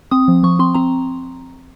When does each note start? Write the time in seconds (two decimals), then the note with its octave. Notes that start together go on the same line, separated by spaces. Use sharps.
0.11 C4 D#6
0.28 F3
0.43 F3 C#6
0.59 C4 C6
0.75 C4 A#5